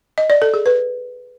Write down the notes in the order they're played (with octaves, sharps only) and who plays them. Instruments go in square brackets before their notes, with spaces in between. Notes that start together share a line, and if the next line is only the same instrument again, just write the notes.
[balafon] D#5
D5
A4
G#4
B4